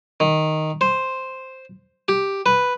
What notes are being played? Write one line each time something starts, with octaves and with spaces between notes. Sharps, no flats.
D#3
C5
G4
B4